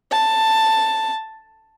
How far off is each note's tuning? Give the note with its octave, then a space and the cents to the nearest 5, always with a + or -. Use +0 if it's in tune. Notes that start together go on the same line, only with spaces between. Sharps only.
A5 +10